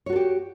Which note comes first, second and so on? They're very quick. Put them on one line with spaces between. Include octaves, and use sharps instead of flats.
C#5 F#4 A4 G4